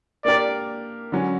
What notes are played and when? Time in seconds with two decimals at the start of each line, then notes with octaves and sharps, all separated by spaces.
0.25 A#3 D4 G4 A#4 D5
1.12 D3 F#3 C#4